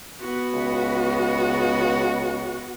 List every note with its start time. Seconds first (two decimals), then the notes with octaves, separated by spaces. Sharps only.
0.21 B3 F#4
0.53 C#2